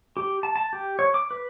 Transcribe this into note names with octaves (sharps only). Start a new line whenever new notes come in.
G4
A5
A5
G4
C#5
D6
B4